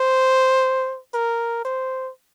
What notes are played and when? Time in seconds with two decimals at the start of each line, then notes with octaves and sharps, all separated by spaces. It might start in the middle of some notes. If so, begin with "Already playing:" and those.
Already playing: C5
1.14 A#4
1.65 C5